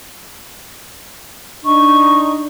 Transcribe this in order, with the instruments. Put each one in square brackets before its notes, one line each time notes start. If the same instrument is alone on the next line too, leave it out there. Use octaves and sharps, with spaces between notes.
[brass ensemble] D4 D#4 [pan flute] C#6